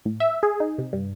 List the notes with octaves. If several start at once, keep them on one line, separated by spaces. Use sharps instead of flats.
A2
E5
G#4
D#4
C3
G2